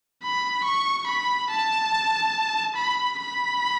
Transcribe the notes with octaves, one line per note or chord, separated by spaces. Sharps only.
B5
C#6
B5
A5
B5
B5